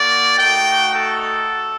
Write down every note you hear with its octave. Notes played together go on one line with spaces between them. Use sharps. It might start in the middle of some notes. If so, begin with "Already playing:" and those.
Already playing: A#3 F#4 D5
A3 D#4 F#4 G5
A4